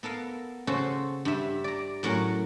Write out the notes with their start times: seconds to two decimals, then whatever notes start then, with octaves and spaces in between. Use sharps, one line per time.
0.03 B3 A4 A#4 F5
0.67 C#3 C#4 F#4 A4 C5
1.25 G2 E5
1.64 D5 A#5
2.03 A2 F#3 C#4 A#4 F#5